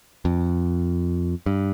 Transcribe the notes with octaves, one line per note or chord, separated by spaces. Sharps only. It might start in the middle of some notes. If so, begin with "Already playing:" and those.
F2
G2